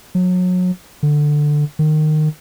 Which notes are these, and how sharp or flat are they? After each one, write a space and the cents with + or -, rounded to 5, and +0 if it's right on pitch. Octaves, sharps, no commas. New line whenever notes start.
F#3 -30
D3 +10
D#3 -20